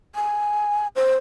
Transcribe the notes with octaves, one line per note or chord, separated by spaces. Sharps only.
G#5
C5